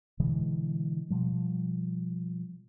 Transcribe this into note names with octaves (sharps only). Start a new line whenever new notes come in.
B2 D3 E3 G#3
B2 F3 G3